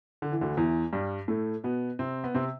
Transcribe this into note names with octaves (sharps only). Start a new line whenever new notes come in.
D3
E3
D2 D3
E2 E3
G2 G3
A2 A3
B2 B3
C3 C4
B3
C3 C4